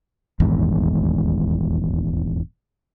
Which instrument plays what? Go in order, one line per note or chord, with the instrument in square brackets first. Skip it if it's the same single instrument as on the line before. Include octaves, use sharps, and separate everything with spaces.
[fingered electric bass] D#1 G#1 E2 G#2